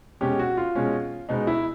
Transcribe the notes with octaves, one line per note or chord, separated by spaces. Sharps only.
B2 G#3 C#4 G4
F#4
F4
B2 G#3 C#4
B2 G#3 B3 D#4
E4